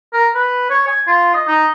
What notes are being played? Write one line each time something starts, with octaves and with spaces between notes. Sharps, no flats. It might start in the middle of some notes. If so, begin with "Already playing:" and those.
A#4
B4
C#5
G#5
F4
D#5
D#4